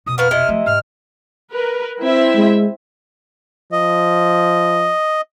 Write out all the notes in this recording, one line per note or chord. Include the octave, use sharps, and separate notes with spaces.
F2 B2 D#6
A#3 B3 F#4 B4 F6
C3 E4 D#5 E5
F3 A3
G#2 F6
A#4 B4
C4 E4 E5
G#3
F3 D#5